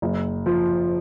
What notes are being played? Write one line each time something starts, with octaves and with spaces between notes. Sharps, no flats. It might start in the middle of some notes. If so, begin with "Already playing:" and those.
F#1
F3